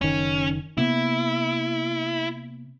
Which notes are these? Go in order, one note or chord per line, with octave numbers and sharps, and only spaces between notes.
F#1 D#3 C#4
C3 A#3 B3 E4